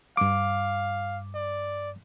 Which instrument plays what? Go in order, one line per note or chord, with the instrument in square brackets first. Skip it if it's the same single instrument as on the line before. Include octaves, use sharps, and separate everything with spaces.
[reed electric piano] G2 D6 [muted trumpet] F5
[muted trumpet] D5